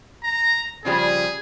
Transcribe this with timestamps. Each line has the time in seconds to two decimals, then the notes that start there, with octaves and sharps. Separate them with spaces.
0.24 A#5
0.85 C#3 F3 G3 G#4